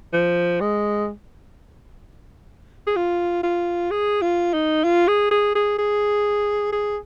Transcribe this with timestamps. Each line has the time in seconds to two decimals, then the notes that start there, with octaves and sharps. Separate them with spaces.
0.13 F3
0.60 G#3
2.87 G#4
2.96 F4
3.43 F4
3.91 G#4
4.21 F4
4.53 D#4
4.84 F4
5.08 G#4
5.31 G#4
5.55 G#4
5.78 G#4
6.72 G#4